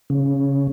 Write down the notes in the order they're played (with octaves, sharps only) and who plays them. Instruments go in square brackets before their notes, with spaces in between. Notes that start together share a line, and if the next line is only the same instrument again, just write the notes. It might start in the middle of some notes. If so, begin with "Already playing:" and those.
[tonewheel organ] C#3